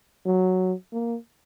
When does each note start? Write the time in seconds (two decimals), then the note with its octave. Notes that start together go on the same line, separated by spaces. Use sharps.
0.25 F#3
0.92 A#3